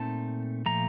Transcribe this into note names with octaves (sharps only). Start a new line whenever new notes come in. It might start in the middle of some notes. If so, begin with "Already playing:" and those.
Already playing: A#2 A3 C4 D#4 A5
A#2 F3 A3 A#5